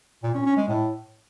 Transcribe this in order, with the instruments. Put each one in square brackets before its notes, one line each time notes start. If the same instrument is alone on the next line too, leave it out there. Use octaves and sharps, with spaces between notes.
[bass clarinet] A#2
C#4
C#4
G#3
A2